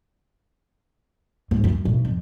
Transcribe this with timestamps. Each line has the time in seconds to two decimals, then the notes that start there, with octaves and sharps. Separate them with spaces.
1.51 G#2
1.64 F#2
1.85 B1
2.05 F2